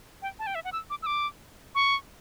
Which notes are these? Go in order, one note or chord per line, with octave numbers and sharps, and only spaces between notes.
G5
A5
G5
E5
F#5
E6
D6
E6
D6
C#6